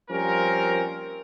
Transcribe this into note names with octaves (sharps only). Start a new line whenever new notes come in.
F3 G3 A#3 C4 C#4 A#4